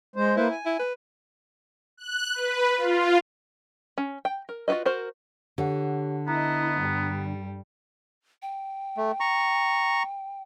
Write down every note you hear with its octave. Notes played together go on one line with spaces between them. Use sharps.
G#3 C5
A#3 E4 B4 C5
G#5
E4
B4
F#6
B4
F4
C#4
G5
A#4
F4 F#4 A4 B4 D#5
F#4 A#4 C5
D3 G4 C#5 F#5
B3 E4 D#5 A#5
G2 G3
G5
A3
A#5 C#6